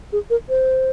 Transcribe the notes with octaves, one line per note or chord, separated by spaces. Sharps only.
G#4
A#4
C5